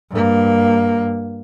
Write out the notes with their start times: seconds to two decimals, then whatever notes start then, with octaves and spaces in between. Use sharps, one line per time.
0.11 G2 A#3